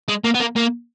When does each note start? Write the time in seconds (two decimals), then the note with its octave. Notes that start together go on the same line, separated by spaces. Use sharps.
0.09 G#3
0.24 A#3
0.34 B3
0.40 A#3
0.56 A#3